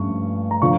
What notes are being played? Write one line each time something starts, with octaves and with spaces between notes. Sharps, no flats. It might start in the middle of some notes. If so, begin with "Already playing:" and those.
Already playing: G2 F3 A3 C#4 C#6
A#5
D3 F3 C#6